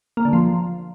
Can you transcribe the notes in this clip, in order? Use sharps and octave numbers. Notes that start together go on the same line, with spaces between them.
A#3
D3
F3